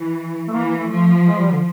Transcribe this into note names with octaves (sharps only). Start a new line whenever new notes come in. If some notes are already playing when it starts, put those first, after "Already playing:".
Already playing: E3
A3
E3 A#3
A#3
A3
F3
G#3
G3
D3